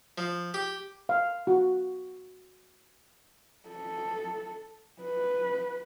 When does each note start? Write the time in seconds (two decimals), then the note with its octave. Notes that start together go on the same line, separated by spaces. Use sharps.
0.18 F3
0.54 G4
1.09 F5
1.47 F#4
3.69 A4
5.02 B4